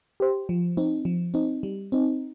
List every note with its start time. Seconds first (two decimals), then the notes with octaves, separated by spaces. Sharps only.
0.20 G4 C5
0.49 F3
0.77 C4 D#4
1.05 F3
1.34 C4 D#4
1.63 G3
1.92 C4 D#4